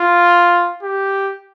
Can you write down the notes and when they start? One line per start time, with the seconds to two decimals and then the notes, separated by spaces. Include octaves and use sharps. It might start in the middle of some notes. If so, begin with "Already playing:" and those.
Already playing: F4
0.83 G4